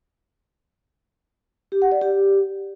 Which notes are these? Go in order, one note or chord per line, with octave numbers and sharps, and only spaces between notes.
G4
F#5
D5
G4